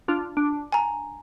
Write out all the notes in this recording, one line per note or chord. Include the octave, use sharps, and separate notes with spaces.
D4 F4
D4
G#5 A#5